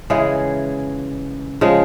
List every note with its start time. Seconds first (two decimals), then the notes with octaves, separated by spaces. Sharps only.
0.10 C#3 E3 G#3 G#4
1.61 C#3 F3 G#3